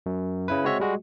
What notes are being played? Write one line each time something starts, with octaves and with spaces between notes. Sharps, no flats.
F#2
C#3 E4 B4
G#3 C4 F#4 C#5 E5
G3 G#3 F#4